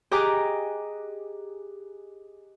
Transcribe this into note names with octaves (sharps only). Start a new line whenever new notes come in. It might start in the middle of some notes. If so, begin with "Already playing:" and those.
G4 G#4 D#5 A#5 D6 F#6